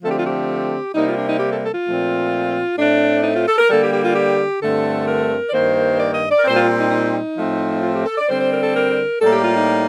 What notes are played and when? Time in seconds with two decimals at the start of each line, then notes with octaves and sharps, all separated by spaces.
0.02 D3 F3 A3 C4 A4
0.11 G4
0.19 F4
0.27 G4
0.94 C3 G3 A#3 D#4
1.06 F4
1.17 D4
1.29 D#4
1.40 G4
1.51 A4
1.63 A4
1.74 F4
1.86 A#2 F3 A3 C4
2.77 A2 A3 C4 D4
3.23 D#4
3.36 F4
3.47 A4
3.58 A#4
3.70 D3 G3 A#3 A4
3.82 G4
3.93 G4
4.05 F4
4.15 G4
4.62 G2 D3 A3 C4 A4
5.07 A#4
5.49 D5
5.53 G2 D#3 A#3 C5
5.99 D5
6.14 D#5
6.30 D5
6.38 A#4
6.45 A#2 G3 C4 C5
6.56 F4
6.80 D#4
6.91 D#4
7.36 A2 F3 A3 C4
7.82 F4
7.95 G4
8.06 A4
8.18 D5
8.29 D3 G3 C4 C5
8.40 C5
8.51 A#4
8.63 A4
8.75 A#4
9.20 A2 G3 A#3 A4
9.33 G4
9.44 F4
9.54 D#4